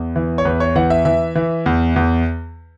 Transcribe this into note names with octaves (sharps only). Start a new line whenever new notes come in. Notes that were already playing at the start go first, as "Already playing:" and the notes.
Already playing: E2
E3
C#5
E2 B4
C#5
E3 F#5
E5
E3 E5
E3
E2
E2